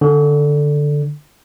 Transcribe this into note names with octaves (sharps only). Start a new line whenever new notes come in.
D3